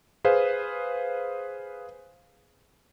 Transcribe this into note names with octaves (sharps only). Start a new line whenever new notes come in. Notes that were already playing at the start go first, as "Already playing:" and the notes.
G#4 B4 C5 F5